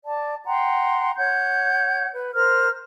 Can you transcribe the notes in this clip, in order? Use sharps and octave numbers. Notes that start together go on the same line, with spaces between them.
D5 A5
F#5 G5 A#5 C6
C#5 F#5 G6
B4
A#4 C5 F6